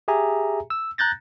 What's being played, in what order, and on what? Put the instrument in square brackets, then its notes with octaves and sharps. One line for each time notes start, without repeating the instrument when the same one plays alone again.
[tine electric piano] G4 G#4 E5 G#5 A#5
E6
A#5 F#6 G6 A6 A#6